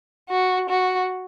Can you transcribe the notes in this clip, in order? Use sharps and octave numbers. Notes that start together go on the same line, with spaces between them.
F#4
F#4